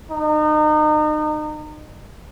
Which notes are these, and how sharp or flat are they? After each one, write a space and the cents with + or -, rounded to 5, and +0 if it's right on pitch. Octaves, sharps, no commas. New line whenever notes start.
D#4 -35